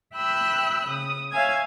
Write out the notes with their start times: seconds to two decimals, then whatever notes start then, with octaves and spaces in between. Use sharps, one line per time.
0.15 E5 G5 B5 E6 F#6
0.87 C#3 D#6
1.31 C#5 E5 F5 G#5 G#6